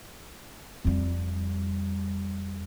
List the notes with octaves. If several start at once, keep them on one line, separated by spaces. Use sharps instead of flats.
F2 G3